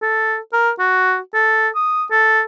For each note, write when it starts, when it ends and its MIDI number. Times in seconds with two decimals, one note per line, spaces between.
0.02 0.37 69
0.53 0.70 70
0.79 1.18 66
1.34 1.68 69
1.75 2.05 87
2.11 2.42 69